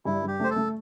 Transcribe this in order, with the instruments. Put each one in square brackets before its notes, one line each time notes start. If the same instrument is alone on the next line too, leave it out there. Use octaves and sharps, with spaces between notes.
[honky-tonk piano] G2 [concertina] E4
[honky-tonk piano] G2 [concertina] G4
[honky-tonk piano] A3 [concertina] C5
[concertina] A4
[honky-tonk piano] A3